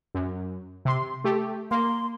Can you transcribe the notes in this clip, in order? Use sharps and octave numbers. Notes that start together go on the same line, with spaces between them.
F#2
C3 C6
A3 G4
A#3 C6